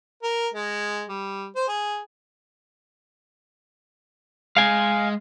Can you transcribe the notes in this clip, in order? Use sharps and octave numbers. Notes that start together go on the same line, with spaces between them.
A#4
G#3
G3
C5
G#4
G#3 F5 G#5